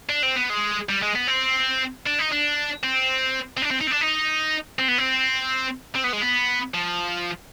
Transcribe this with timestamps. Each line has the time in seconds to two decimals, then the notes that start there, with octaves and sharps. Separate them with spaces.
0.09 D4
0.23 C4
0.36 B3
0.50 G#3
0.89 G3
1.02 G#3
1.15 B3
1.27 C4
2.06 D4
2.19 D#4
2.32 D4
2.83 C4
3.57 C4
3.62 D4
3.71 C4
3.81 D#4
3.87 C4
3.91 D4
4.01 D#4
4.79 C4
4.88 B3
4.98 C4
5.95 C4
6.04 B3
6.13 G#3
6.21 B3
6.74 F3